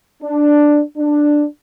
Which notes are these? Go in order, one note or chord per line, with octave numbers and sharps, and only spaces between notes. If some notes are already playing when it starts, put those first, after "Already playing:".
D4
D4